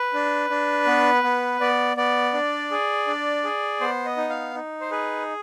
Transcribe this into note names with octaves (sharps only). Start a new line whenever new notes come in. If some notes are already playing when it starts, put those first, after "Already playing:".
Already playing: B4
D4
D4
B3
B3
B3 D5
B3 D5
D4
G#4
D4
G#4
B3 C5
D#5
D#4
F5
D#4
C5
G#4 B4